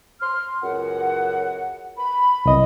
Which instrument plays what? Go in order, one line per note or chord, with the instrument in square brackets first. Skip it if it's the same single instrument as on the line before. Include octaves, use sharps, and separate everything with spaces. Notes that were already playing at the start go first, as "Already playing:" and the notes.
[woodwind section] C6 F6
C#2 F#2 F#5
B5
[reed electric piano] C2 D#5